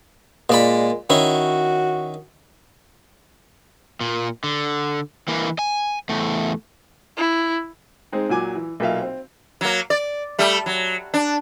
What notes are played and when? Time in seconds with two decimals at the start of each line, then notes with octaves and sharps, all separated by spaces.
0.50 A#2 G#3 D5 B5
1.10 D#3 C#4 E4 F#4
4.01 A#2
4.44 D3
5.28 E3 A#3
5.59 G#5
6.09 E2 A3
7.17 E4
8.12 G#3 C4 D#4
8.29 A#2 F#3 G#5 D6
8.55 E3
8.80 B1 A#2 A#3 E5 F5
9.01 C4
9.61 F#3 A#3
9.90 D5
10.39 G3 A3
10.66 F#3
11.14 D4